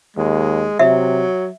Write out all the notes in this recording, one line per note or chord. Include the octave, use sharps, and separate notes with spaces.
D#2 G#3
C3 F#3 E5